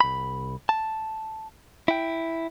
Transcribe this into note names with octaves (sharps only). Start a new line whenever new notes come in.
C2 B5
A5
E4 G5